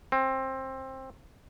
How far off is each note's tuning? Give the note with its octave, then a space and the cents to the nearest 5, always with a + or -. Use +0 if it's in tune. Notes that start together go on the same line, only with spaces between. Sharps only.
C4 +20